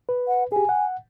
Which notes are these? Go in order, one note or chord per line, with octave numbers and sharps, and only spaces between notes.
B4
F#5
G4 G#4 G#5
F#5